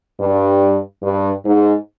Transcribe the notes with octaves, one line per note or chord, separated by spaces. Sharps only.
G2
G2
G#2